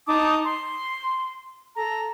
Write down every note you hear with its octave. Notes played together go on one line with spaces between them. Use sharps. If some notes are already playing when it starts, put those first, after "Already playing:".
D#4 A5 D6 D#6
C6
A4 A#5